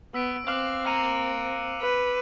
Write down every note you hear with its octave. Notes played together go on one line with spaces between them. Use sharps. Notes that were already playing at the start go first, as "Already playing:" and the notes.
B3 E6 B6 D7
C4 F5 D6 F#6 F#7
F5 A#5 C#7 D#7 F7
B4